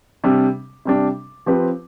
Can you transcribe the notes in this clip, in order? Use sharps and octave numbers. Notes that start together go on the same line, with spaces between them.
C3 G3 D4
C3 G3 D4
F3 C4 G4 B4